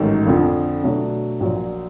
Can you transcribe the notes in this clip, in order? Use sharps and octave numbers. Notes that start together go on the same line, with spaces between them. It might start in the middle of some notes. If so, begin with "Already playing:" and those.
Already playing: A1 G#2 D#3 F#3 A3
F2 D3 F3
B2 F#3 A3 D4
A#1 A#2 F#3